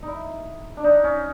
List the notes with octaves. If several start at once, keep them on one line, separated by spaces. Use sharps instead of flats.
D#4 E4
D4
D#4
C#4